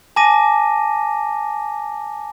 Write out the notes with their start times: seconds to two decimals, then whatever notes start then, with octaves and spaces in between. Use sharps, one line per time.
0.16 G#5 A5 D6 A#6 D#7